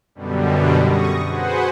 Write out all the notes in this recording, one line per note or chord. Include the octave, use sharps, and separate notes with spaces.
F#2 B2 D3 G3
C#6 D#6 A#6
F#4 G#4 B4 C5 F#5